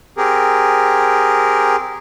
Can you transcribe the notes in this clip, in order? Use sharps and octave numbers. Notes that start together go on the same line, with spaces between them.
C4 G4 G#4 A#4